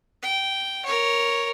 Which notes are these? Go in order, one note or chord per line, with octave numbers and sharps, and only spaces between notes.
G5
A#4 C#5